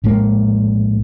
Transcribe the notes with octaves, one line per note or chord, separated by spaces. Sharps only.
A#1 A2 G#3 A#3